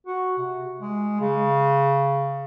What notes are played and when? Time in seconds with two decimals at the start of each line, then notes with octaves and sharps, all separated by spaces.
0.07 F#4
0.38 C3
0.81 G#3
1.20 C#3